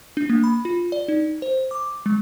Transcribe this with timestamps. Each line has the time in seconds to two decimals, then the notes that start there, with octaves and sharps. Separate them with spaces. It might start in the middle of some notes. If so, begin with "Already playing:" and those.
0.17 D4
0.29 A#3
0.44 B5
0.65 F4
0.92 D5
1.08 D#4
1.42 C5
1.71 D6
2.06 G#3